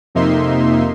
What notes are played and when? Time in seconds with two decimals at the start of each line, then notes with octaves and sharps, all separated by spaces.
0.15 F2 C3 A#3 D#4 E5 C6